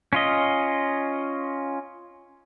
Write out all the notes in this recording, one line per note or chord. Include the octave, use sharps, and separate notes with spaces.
C#4 F4 D#5